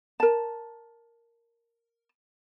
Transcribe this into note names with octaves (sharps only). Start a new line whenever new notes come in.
A#4 A5